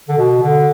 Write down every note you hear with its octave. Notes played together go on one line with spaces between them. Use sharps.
D3
B2
D3